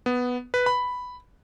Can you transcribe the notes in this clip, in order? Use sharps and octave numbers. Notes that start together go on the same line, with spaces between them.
B3
B4
B5